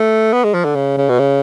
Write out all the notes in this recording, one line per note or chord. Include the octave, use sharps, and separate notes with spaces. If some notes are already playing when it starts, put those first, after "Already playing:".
Already playing: A3
B3
G#3
F3
D3
C#3
C#3
B2
C#3